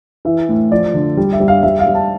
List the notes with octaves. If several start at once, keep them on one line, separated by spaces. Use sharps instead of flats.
E3 E5
A2
F3 D5
D3
G3
E5
G3
F5
G3 E5
F5
G3
A5